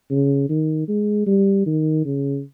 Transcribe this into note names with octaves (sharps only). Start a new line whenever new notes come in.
C#3
D#3
G#3
G3
D#3
C#3